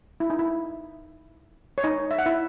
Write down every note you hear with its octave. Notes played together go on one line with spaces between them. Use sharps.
E4
D#4
E4
C#5
D#4 D#5
E5
F#5
E4 E5